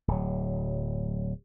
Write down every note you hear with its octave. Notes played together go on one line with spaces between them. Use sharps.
D1 F#3